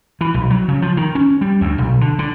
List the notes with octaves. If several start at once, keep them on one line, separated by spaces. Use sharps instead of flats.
E3
B1
F#3
C#3
F3
D#3
C#4
G3
D2
B1
D3
D3